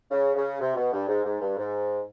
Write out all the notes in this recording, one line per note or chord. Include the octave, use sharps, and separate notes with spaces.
C#3
C#3
C3
B2
G2
G#2
G#2
G2
G#2